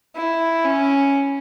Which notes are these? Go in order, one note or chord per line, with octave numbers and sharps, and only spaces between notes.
E4
C#4